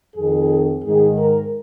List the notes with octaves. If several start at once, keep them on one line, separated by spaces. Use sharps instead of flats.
F2 D#3 G#4
G#2 D#3 G#4
A#4